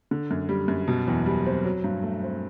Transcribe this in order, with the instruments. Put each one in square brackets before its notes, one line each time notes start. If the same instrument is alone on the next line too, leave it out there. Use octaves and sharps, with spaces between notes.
[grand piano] D3
F#2
G3
F#2
B2
E2
G3
C4
F#3
G2
A3
C4